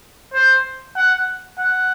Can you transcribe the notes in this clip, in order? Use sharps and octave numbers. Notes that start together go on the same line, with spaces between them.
C5
F#5
F#5